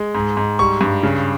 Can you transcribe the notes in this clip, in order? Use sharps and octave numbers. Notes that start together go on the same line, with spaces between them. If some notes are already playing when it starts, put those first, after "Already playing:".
Already playing: G#3
G#2
G#2
G3 C#6
G2
C#3